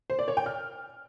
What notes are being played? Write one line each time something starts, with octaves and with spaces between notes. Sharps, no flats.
C5
D5
C#5
G5
F6